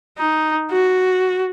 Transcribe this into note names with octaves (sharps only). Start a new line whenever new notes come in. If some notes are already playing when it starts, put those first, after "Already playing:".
D#4
F#4